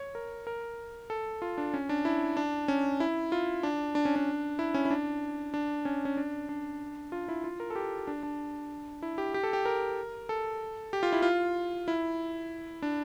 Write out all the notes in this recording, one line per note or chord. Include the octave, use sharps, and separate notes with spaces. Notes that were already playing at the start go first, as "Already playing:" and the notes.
Already playing: C#5
A#4
A#4
A4
F4
D4
C#4
D4
E4
D4
C#4
E4
F4
D4
D4
C#4
D4
E4
C#4
E4
D4
D4
C#4
C#4
D4
D4
F4
E4
F4
A#4
A4
G4
D4
D4
E4
G4
G4
A4
G4
A#4
A4
G4
F4
E4
F4
E4
D4